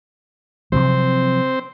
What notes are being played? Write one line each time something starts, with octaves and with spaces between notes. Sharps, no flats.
C3 F3 F#3 C4 C5